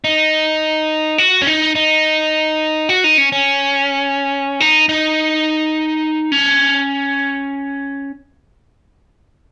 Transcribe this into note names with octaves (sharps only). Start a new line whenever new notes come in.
D#4
F#4
C#4
D#4
D#4
F#4
D#4
C#4
C#4
D#4
D#4
C#4